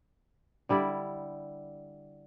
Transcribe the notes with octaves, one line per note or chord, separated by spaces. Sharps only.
D3 G3 E4 D5